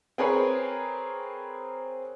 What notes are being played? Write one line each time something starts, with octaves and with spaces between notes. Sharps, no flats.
C4 G#4 A#4 B4 C#5